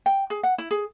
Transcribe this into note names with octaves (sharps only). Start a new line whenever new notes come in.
G5
G#4
F#5
E4
G#4